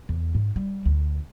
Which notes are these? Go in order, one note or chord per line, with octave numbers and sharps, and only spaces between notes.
E2
G#2
G3
D2